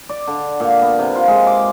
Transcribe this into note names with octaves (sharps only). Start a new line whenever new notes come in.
D5
D3
A#2
B3
C3
F4
G#3
D6